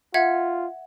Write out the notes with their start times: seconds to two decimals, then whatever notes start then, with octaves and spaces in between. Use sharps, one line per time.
0.14 F4 E5 F#5 G#6